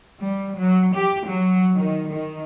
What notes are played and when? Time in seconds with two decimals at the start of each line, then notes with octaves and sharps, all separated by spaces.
0.20 G3
0.58 F#3
0.95 G4
1.27 F#3
1.75 D#3
2.09 D#3